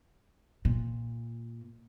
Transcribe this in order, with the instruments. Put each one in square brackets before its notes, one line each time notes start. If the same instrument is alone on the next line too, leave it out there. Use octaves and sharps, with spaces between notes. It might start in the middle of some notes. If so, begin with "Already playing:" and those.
[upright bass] A#2